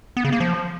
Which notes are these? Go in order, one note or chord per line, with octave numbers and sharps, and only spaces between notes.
B3
C#3
A#3
F3